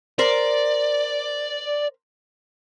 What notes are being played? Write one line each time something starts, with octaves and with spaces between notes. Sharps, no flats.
A#4 C5 D5